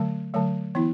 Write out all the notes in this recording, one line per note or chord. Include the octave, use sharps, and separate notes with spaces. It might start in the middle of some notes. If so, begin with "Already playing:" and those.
Already playing: D3 F#3 A3
D3 F#3 A3
E3 B3 E4